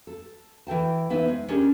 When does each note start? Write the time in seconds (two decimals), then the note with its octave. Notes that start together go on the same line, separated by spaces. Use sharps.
0.07 A4
0.67 E3 A4 G5 A5
1.10 E3 B3 D#4 E5
1.28 G#3
1.48 C#4 D4 G4 G#4 A#4